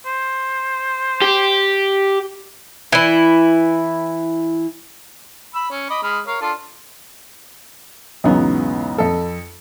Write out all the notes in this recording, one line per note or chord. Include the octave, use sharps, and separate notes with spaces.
C5
G4
E3 E4
B5 E6
C#4
D#5 B5 D6
G#3 B5 F6
A#4 C#5 F5
D4 F4 A4
B1 E2 G#2 C#3 F#3 B3
F2 A4